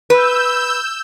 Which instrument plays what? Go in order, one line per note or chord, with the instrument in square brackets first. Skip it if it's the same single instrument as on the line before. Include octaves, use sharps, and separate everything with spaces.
[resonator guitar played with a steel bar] B4 [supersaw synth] E6 G6